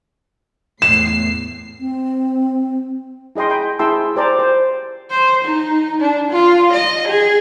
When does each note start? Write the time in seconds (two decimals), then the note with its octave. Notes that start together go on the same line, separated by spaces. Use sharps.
0.82 E2 A2 C7 E7
1.80 C4
3.35 E4 G#4 D#5 G5 C6
3.50 G5 B5
3.79 E4 G#4 G5 A5 C6 E6
4.16 G4 C5 D5 A#5
4.39 C5
5.11 C5
5.44 D#4
6.01 D4
6.31 F4
6.72 D#5
7.08 G#4